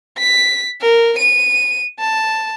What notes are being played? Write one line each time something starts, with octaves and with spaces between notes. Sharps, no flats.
B6
A#4
D#7
A5